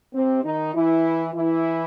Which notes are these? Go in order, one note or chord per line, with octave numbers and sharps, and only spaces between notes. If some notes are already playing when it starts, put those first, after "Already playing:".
C3 C4
D#3 D#4
E3 E4
E3 E4